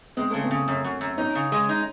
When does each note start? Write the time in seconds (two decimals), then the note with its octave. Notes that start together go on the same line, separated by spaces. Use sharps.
0.17 G#3 C4
0.31 C#3 A3
0.44 C4
0.51 C#3
0.68 F#2
0.84 F#2
1.01 F#2
1.18 C#4 D#4
1.35 C#3
1.52 G#3
1.69 D#4